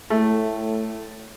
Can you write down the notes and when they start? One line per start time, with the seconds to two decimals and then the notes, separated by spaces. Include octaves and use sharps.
0.10 A2 A3